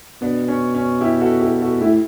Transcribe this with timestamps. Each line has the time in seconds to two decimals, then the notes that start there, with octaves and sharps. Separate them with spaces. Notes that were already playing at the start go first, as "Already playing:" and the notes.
0.22 B2 B3 D4
0.48 C#4
0.75 C#4
1.01 E4 G4
1.21 F#4 A4
1.41 E4 G4
1.61 F#4 A4
1.81 A2 E4 G4